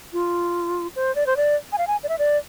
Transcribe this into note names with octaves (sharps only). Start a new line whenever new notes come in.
F4
C5
D5
C5
D5
G#5
F5
G#5
D5
E5
D5